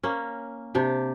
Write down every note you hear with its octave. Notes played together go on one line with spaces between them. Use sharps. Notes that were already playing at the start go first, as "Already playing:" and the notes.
A#3 C#4
C3 D4 G4